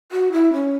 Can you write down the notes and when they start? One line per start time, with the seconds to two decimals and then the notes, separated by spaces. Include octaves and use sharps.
0.12 F#4
0.32 E4
0.53 C#4